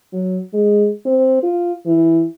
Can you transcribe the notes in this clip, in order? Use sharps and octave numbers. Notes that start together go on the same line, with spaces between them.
F#3
G#3
C4
F4
E3